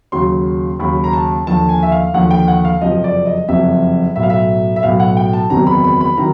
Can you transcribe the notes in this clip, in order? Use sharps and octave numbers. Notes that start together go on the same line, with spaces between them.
D#2 C#3 F#3 C6
D#2 C#3 F#3 B5
A#5
A5
D#2 D3 F3 A5
G#5
E5
F5
D#2 D3 F3 F#5
G5
F#5
F5
F#1 F2 C3 F3 D#5
D5
D#5
F#1 F2 C3 F3 E5
B1 A2 F#3 E5
F5
E5
E5
B1 A2 F#3 F5
F#5
G5
A5
F#1 E2 C3 D#3 F#3 A#5
B5
B5
B5
C3 D#3 F#3 A#5